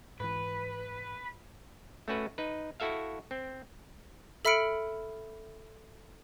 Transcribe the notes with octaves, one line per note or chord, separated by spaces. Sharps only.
G#2 E3 B4
A3 C#4 F#4 B4
D#4 B4
E4 F#4 A4 E5 F5
C4
A4 E5 B5 F6 C#7 D7